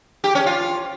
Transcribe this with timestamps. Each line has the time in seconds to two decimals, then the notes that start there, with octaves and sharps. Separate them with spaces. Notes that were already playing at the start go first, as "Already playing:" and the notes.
0.24 G4
0.35 C#4
0.46 F4